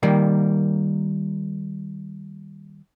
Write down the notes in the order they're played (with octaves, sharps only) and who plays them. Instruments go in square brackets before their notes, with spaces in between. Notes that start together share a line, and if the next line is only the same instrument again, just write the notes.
[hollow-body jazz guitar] D#3 G3 A#3